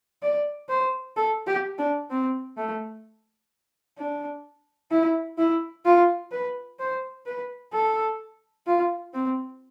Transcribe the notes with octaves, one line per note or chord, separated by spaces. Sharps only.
D5
C5
A4
G4
D4
C4
A3
D4
E4
E4
F4
B4
C5
B4
A4
F4
C4